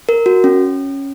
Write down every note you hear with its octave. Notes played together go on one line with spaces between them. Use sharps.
A#4
F#4
C#4